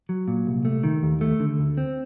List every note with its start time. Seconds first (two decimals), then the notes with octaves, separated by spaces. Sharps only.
0.09 F#3
0.28 A#2
0.47 C2
0.65 A3
0.83 D#3
1.03 D#2
1.21 A3
1.40 D3
1.59 D2
1.77 C4